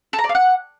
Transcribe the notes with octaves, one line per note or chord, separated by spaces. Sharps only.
A4
A#5
D5
F5
F#5